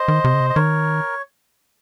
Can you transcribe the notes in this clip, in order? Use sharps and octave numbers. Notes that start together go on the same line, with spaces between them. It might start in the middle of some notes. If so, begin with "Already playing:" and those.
Already playing: C5 D#5
D#3
C3
C#3
C3
D#5
D#3 A#4 C#5